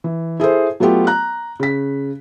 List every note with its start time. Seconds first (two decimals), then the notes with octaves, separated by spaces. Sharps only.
0.04 E3
0.40 E4 G#4 A4 C5
0.80 F#3 A3 B3 F4 G4
1.07 A#5 F#6
1.60 C#3 B6